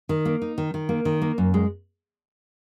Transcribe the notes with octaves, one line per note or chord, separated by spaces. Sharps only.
D#3
A#3
D#4
D#3
D#3
A#3
D#3
A#3
F#2
G#3